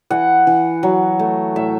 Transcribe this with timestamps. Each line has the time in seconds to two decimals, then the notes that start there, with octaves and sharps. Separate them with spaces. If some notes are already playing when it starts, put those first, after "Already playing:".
0.10 E3 F#5
0.47 E3
0.83 F#3
1.19 A3
1.56 A2 E5